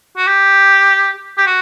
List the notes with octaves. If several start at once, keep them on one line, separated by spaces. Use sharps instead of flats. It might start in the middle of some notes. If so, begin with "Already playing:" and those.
F#4
G4
G4
F#4